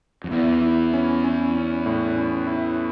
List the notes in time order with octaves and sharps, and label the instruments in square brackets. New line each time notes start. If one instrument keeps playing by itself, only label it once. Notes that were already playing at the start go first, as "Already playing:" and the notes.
[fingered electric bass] F2
[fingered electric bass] E2 [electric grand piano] E4
[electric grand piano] E4
C#4
C#4
C#4
A2
C#4
E4